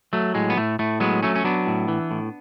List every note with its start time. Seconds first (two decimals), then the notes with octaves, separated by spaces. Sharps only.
0.13 F#3 A3
0.34 A2 G#3
0.50 B3
0.57 A2 A3
0.79 A2 A3
1.00 F#3 G#3 B3
1.23 F#3 A3 C#4
1.36 C#4
1.44 F#3 B3 D4
1.67 A2
1.88 E3
2.11 A2